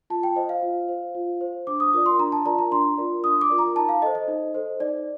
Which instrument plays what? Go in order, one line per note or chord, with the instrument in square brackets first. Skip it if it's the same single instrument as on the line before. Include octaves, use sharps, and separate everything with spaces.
[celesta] F4 A5
G5
C5 D#5
F5
F4
C5
F4
C5
D4 D6
D#6
F4 A#4 D5 D#6
C6
D4 A#5
A5
F4 A#4 D5 A#5
A#5
D4 C6
F4 A#4 D5
D4 D#6
D6
F4 A#4 D5
A#5
D#4 A5
F5
A4 C5 D#5
D#5
D#4
A4 C5
D#4 D5